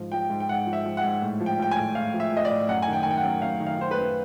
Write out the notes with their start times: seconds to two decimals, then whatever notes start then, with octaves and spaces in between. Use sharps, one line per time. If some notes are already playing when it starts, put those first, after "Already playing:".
Already playing: G#2 F3
0.12 F3 G5
0.30 G#2
0.40 G5
0.49 G#2 F#5
0.67 F3
0.73 E5
0.85 F3
0.97 F#5
1.04 G#2
1.22 A2
1.40 F3
1.46 G5
1.59 F3 G5
1.71 G#5
1.76 A2
1.95 A2 F5
2.14 F3
2.20 E5
2.33 F3 D#5
2.45 D5
2.50 A2
2.68 F#2 F#5
2.82 D#3 G#5
2.93 G5
3.03 G#5
3.06 D#3 G5
3.17 F#5
3.23 F#2
3.42 F#2 F5
3.60 D#3
3.67 F5
3.79 D#3 C5
3.91 B4
3.97 F#2